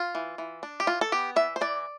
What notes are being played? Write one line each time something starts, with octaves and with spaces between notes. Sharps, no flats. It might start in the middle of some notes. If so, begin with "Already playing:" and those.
Already playing: F4
E3
E3
D4
G4
E3 F4
A4
B3 G4
E3 E5
C5
E3 D5